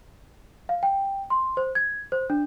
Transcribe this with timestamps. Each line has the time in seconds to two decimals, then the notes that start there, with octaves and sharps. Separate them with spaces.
0.69 F5
0.83 G5
1.30 C6
1.57 C5
1.75 G#6
2.12 C5
2.30 D4